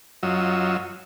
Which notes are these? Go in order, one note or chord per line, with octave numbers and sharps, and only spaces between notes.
F#2 F#3 F4 D#5 E6